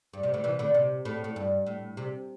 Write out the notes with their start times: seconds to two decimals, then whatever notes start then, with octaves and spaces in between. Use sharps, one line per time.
0.13 G2
0.23 C3
0.34 A2 D3
0.44 C3 E3
0.59 A2 D3
0.74 C3
1.05 A2
1.24 A2
1.36 G2
1.66 A2
1.97 C3